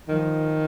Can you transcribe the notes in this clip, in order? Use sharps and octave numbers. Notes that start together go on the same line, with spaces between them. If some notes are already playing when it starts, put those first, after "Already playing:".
D#3 F3